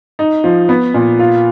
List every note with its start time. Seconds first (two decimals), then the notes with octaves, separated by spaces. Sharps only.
0.19 D#4
0.44 F3
0.69 B3
0.94 A#2
1.19 F4